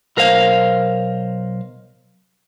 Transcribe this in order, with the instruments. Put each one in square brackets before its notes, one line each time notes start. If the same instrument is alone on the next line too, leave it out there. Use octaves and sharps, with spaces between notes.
[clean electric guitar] B1 A#4 C5 F5